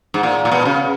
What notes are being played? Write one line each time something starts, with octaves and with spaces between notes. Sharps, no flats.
G#2
A#2
A#2
B2
C#3